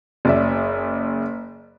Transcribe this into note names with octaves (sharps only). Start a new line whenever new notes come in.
F#1 D5 E5